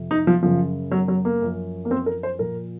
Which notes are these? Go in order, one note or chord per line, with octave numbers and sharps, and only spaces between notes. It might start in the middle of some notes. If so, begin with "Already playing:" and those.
Already playing: F2 C3
D#4
F3
F#2 C#3 F3
F#3
F#3
A#3
F#2 F3
A#3
C4
A#4
C5
A#2 F3 A#4